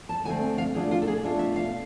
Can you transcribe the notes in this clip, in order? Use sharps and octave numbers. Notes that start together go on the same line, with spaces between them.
A5
D3 A3 C4 G#5
F5
B2 A3 D4 F4 G#4
F4
A4
G#4
B2 A3 D4 F4
E5
F5